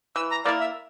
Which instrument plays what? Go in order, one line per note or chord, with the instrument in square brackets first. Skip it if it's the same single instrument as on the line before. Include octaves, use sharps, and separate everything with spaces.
[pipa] E3 [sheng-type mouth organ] E6
[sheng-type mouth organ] A#5
[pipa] A#3 E4 A#4 [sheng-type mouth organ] D5
[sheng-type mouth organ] E5